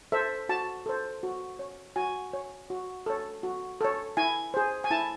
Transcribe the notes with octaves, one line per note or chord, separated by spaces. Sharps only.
A4 C5 E5
F#4 A5
A4 C5
F#4
C#5
F#4 G#5
C#5
F#4
A4 C#5
F#4
A4 C#5
E4 G#5
G#4 C5
G#5
E4 A5